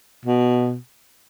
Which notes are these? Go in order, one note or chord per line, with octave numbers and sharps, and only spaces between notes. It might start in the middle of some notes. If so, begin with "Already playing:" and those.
B2